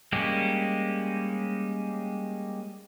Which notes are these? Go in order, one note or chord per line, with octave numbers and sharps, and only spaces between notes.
G3 G#3 A#3 C#4 G4